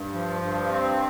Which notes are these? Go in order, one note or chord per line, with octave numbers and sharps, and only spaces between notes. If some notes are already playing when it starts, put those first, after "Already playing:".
Already playing: G2
F3
G2
C4